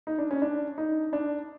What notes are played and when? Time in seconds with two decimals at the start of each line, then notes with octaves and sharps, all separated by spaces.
0.07 D#4
0.18 D4
0.31 C#4
0.42 D4
0.78 D#4
1.13 D4